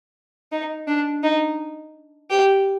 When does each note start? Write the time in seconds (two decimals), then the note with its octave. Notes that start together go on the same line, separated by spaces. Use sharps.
0.52 D#4
0.87 D4
1.23 D#4
2.30 G4